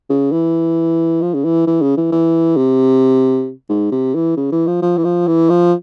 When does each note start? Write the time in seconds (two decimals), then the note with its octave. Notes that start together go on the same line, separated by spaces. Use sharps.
0.10 C#3
0.32 E3
1.22 F3
1.34 C#3
1.45 E3
1.67 E3
1.82 C#3
1.97 E3
2.12 E3
2.57 C3
3.69 G#2
3.92 C3
4.15 E3
4.37 C#3
4.52 E3
4.67 F3
4.82 F3
4.97 E3
5.04 F3
5.27 E3
5.50 F3